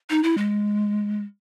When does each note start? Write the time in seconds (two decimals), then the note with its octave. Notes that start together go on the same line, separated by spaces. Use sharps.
0.10 D#4
0.23 E4
0.38 G#3